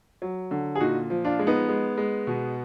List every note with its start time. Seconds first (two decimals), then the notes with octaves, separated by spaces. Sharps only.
0.22 F#3
0.51 D3
0.75 G#4
0.81 A#2 D#4 F#4
1.10 F3
1.25 D4 F4
1.39 G#3
1.47 B3 D#4
1.69 G#3
1.97 G#3
2.27 B2